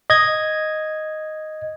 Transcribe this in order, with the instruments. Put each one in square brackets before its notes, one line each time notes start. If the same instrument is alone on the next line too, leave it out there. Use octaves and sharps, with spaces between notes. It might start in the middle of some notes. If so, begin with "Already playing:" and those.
[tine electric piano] D#5 G#6